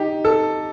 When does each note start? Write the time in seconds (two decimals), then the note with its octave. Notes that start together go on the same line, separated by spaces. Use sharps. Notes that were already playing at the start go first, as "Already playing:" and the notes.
Already playing: D#4 G4
0.25 A4